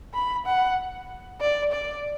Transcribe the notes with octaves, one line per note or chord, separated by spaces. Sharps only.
B5
F#5
D5
D5